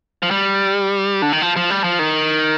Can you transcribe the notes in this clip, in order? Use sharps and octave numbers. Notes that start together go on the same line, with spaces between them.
F3
G3
D3
D#3
F3
F3
G3
F3
D#3